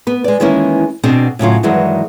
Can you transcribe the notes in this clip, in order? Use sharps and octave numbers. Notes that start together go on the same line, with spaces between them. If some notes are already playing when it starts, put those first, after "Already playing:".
B3 B4
G#3 D5
D#3 E3 G#3 A#3 C#4 E4
B2 C4 D4 G#4 F#5
A2 C#3 F#3 F4
G2 D#3 E3 F#3 G#3 F#4